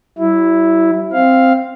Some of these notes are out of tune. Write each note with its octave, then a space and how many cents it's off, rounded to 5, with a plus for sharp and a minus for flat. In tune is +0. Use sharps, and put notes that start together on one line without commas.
F#3 +45 E4 +0
C4 +0 F5 +0